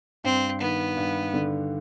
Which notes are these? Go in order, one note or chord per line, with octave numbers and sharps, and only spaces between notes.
G2 C4
D#3 B3
G2
D3